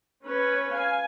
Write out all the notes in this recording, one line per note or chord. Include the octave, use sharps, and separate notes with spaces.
C#4 B4 C#5
F5 G#5